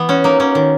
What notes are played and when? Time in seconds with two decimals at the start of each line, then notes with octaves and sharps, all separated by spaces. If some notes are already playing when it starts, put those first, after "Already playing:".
Already playing: E3 B3
0.09 C#4 F#4
0.24 A#3 D#4
0.40 A#3 C#4
0.55 D#3